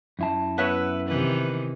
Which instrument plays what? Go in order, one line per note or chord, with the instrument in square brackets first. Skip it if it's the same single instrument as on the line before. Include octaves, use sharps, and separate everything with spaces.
[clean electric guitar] F#2 E4 A5
[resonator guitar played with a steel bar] B3 C#5 E5 [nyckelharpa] B4
[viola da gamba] C3 D#3 E3 [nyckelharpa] B4